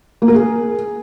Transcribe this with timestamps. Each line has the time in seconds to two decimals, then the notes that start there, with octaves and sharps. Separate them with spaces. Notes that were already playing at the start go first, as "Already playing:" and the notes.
0.22 A#3
0.28 A#4
0.34 G#4